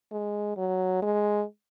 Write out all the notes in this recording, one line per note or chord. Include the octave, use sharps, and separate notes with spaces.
G#3
F#3
G#3